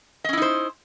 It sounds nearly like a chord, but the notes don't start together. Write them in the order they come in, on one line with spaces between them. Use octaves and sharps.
D#5 C#4 E4 D#4 C5